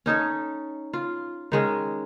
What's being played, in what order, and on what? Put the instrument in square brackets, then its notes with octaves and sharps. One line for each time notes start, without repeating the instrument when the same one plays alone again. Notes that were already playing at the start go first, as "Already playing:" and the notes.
[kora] C#4 D#4 A4 C#5
F4
D#3 G#3 C#4